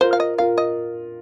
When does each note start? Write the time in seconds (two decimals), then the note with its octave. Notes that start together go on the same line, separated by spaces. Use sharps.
0.01 F4 A#4 C5
0.13 F5
0.20 D#5
0.38 F4 A#4 F5
0.58 D#5